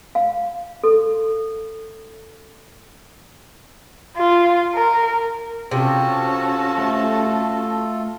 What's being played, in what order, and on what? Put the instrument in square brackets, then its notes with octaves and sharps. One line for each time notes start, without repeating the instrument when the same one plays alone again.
[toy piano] F5
A4
[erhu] F4
A#4
[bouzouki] C3 [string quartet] C#4 F#4 A5 [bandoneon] F4 A4
[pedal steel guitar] A3